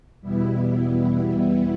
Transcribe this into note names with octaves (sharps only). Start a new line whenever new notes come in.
E2 B2 G3 B3 E4